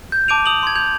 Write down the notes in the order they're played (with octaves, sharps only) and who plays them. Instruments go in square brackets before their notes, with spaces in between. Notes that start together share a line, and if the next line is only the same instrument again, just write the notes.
[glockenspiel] G6
A5 D6 G6 D7 D#7 F7
D#6 F7 F#7
C6 G#6
G6 G#6 F7